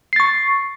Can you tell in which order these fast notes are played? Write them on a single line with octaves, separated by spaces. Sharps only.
C7 A6 C#6